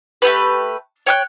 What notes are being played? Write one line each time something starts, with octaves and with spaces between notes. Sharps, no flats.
A3 B3 G4 B4
C#5 G5 F6 F#6